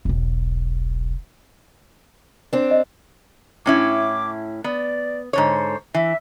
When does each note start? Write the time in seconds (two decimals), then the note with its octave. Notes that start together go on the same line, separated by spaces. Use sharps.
0.05 E1 B1
2.53 C4 D4
2.71 D#5
3.66 A2 C#4 E4 D6
4.64 B3 D5
5.33 G#2 D3 C5 C#5
5.94 E3 E5